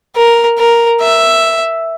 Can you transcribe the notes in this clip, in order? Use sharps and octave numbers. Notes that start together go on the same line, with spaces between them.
A#4
A#4
E5